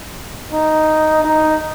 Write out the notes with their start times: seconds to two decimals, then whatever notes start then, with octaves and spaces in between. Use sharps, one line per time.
0.52 D#4
1.24 D#4